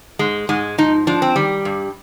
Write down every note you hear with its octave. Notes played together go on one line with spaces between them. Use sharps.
G#2 G#3
G#2 G#3
F3 D#4
F3 D4
C4
D#3 G3
G2